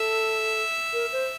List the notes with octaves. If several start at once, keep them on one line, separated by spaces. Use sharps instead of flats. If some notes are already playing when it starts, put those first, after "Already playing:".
Already playing: A4 E5
A#4
C5